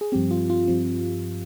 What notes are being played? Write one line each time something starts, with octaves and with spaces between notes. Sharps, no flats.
G#4
G2 F3 C4 G4
F4
F4
G2 F3 C4